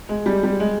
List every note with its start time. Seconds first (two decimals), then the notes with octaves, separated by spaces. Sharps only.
0.09 G#3
0.26 G3
0.43 G3
0.60 G#3